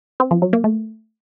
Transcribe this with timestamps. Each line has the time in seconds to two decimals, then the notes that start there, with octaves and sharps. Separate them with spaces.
0.20 C4
0.31 F3
0.42 F#3
0.53 A#3
0.64 A3